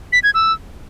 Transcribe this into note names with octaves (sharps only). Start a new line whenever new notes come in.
B6
G#6
E6